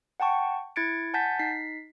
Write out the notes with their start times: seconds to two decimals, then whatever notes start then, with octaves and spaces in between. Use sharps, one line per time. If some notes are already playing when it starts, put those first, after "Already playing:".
0.20 F#5 G5 A5 C#6
0.76 E4 G#6 A6 C#7 D7
1.14 F#5 G#5 A5 G6 A6 B6
1.39 D#4 B6 C7